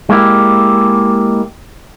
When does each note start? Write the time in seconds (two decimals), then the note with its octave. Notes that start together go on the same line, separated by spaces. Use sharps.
0.10 G#3 A#3 E4 G4